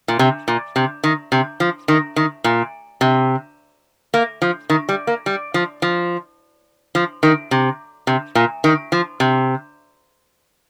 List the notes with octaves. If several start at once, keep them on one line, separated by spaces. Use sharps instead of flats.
A#2
C3
A#2
C3
D#3
C3
F3
D#3
D#3
A#2
C3
A#3
F3
D#3
G3
A#3
G3
F3
F3
F3
D#3
C3
C3
A#2
D#3
F3
C3